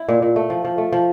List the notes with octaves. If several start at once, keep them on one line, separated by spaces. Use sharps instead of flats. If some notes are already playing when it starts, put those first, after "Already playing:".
Already playing: E4
A#2
A#2
A3
F3
F3
A3
F3